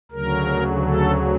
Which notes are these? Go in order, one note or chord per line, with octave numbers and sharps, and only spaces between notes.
D2 C#3 F#3 A#4
A4